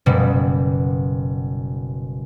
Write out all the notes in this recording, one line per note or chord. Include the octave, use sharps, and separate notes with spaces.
F#1 B2 G3